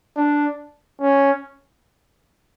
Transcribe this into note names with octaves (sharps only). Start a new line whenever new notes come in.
D4
C#4